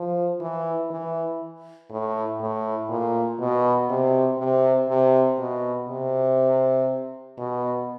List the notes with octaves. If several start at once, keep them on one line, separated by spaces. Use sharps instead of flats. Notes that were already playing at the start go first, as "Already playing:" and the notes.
Already playing: F3
E3
E3
A2
A2
A#2
B2
C3
C3
C3
B2
C3
B2